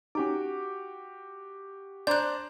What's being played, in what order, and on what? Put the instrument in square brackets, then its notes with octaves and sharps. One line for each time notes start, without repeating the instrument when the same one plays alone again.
[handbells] C#4 D#4 [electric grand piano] F#4 G4 D6
[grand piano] D4 C5 A#5 [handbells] D5 [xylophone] F#6 G6